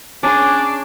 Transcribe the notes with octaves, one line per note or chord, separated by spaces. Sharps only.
C#4 D4 G#4 G#5 A5 C6 D6